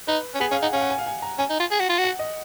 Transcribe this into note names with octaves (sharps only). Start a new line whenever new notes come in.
D#4 B4
C#4
B3 G#4
C#4 F5
D#4 F#5
C#4 F5
F#5
G#5
F5
G#5
A#5
C#4 G#5
D#4
F4
G#4
F#4
F4
F#4
F#5
D#5